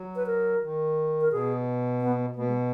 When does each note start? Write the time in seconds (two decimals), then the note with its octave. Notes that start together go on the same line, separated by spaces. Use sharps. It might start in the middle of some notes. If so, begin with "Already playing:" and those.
Already playing: F#3
0.16 B4
0.26 A#4
0.62 D#3
1.21 A#4
1.31 B2 G#4
2.01 B3
2.36 B2 A#3
2.48 G#3